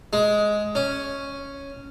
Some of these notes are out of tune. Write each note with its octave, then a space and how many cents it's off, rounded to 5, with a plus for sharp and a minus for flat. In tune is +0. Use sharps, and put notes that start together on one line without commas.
G#3 +10
C#4 +0